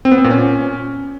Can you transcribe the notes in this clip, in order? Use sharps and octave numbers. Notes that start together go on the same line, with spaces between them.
C4
B3
C4
A#2
C#4